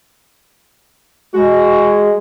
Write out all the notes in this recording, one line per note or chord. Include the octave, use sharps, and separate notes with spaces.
G#3 F#4